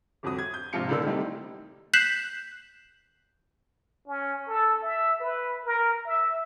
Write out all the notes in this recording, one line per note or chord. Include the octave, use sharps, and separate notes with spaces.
G1 F2 F#4 D#6
G#6
G6
A#1 G#2 C3 F4 C#7
C#2 A#2 D3 D#3 A#3 E6
D#3 E3 G3 A3 C4 D#4
F#6 G6 B6 C7 E7 F#7
C#4
A4
E5
B4
A#4
E5